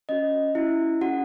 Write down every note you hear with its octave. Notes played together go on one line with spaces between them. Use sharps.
C#4 F#4 D#5
C#4 E4 F#4 E5
C#4 F#4 G#4 F#5